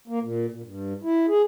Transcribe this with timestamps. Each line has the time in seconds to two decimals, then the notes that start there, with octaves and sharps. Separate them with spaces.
0.08 A#3
0.22 A#2
0.50 A#2
0.64 G2
1.03 E4
1.28 G#4